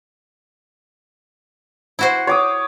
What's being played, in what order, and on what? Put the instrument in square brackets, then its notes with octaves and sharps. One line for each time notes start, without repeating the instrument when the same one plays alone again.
[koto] E4 F#4 C5
[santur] C#5 D6 D#6